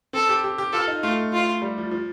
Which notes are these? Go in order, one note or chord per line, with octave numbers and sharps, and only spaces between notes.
C4 A4
G4
G4
G4
F4 A4
D#4
A3 F4
F4
G3
F3
F3